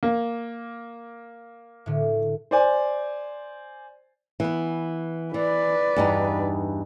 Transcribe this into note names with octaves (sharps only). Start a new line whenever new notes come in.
A#3
A2 D3
C5 D5 G#5
E3 B3
E3 B4 D5
E2 G2 D#4